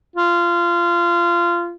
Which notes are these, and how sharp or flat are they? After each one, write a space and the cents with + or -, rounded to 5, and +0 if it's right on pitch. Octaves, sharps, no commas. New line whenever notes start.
F4 -20